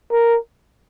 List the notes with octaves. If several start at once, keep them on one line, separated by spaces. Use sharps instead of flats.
A#4